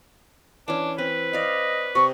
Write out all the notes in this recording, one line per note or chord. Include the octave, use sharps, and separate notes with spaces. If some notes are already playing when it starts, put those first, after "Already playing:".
E3 C#4 D4
C4 B4
D5 D#5 F5
C3 D#5 C#6